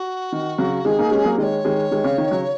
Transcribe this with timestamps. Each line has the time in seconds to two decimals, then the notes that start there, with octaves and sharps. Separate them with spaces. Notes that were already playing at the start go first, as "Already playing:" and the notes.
Already playing: F#4
0.32 D#3
0.58 C#3 F#3
0.85 D#3 G#3 G#4
0.99 A#3 D#4
1.11 G#3 C#4
1.24 F#3 A#3
1.38 D#3 G#3 D#5
1.43 C#5
1.65 D#3 G#3
1.91 D#3 G#3
2.04 C#3
2.18 D#3
2.31 C#3 F#3